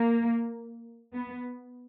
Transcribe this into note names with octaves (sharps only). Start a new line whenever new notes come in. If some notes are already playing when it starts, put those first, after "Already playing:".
Already playing: A#3
B3